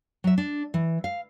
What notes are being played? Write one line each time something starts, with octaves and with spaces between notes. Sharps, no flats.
F#3 E5
D4
E3
F5